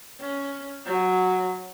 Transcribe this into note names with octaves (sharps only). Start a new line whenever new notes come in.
C#4
F#3